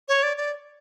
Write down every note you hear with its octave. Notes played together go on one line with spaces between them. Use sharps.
C#5
D5
D5